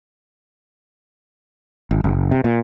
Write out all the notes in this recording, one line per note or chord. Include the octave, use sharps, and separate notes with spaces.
G#1
F#1
C3
A#2